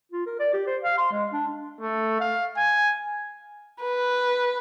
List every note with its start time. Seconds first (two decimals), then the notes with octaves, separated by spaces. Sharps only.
0.12 F4
0.26 A#4
0.39 D5
0.54 G4
0.67 C5
0.83 F5
0.98 C6
1.12 G#3
1.33 D4
1.81 A3
2.20 F5
2.57 G#5
3.82 B4